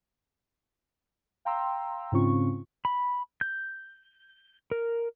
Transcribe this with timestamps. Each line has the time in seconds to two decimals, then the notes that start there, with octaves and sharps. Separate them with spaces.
1.45 F5 G5 A#5 C6 E6
2.12 G#2 C#3 C4 C#4 F4 C#6
2.85 B5
3.41 G6
4.71 A#4